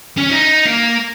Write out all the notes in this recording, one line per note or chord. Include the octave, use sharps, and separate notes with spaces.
C#4
D#4
A#3